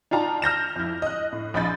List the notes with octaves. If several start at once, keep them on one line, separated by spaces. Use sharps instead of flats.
D4 D#4 F4 A5 A#5
F6 G6 A#6 E7
F2 E4
D#5 F#6
A2
A#1 D#5 B5 G6 A6